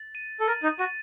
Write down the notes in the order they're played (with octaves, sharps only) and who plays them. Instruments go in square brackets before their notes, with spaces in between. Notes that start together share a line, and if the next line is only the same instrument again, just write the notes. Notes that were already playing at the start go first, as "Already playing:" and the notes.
Already playing: [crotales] A6
D#7
[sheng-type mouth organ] A4
[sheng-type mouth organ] A#4 [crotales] A6
[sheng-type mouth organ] D#4
[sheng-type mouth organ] F#4 [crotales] D#7